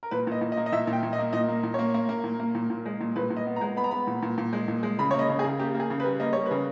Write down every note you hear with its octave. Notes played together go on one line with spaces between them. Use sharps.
A#4
A#2 B4
A#2 D#5
A#2
D#5
A#3
D#5
A#2 E5
A#2
G5
A#2
D#5
A#3
A#2 D#5
A#3
A#2
A#3 C#5
A#3
A#3
A#2
A#3
A#2
A#2
G#3
A#2
A#2 B4
A#2
D#5
B3
A#5
G#3
B3 B5
A#5
B3 B5
A#2
A#2
A#2
G#3
A#2
G#3
C#3 B5
A#3 C#5
D#5
C#3
G#4
C#3
A#3 G4
A#3
G#4
C#3
B4
G3
A#3 D#5
G3 C#5
C#3 B4